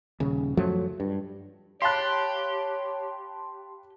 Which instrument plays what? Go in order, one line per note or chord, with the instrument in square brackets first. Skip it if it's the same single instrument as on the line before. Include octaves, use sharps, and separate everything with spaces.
[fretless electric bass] D#1 C#3
F#2 F3 F#3 A3
G2
[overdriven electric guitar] G4 [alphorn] C#5 [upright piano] F5 B5 F#6 [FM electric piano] A5 C6